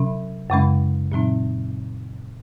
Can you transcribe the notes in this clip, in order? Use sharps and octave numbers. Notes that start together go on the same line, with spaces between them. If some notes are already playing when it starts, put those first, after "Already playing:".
Already playing: C3 F#3 C#4
F#2 C#3 G#3 C#4
A#2 F#3 C4 D#4